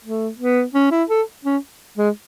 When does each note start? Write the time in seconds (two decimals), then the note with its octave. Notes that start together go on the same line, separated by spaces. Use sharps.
0.04 A3
0.38 B3
0.74 C#4
0.91 E4
1.09 A4
1.45 C#4
1.97 G#3